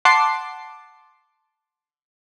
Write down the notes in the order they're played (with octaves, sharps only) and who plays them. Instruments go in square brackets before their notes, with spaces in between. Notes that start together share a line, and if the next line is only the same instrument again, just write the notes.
[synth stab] F#5 A5 C6 D6 C7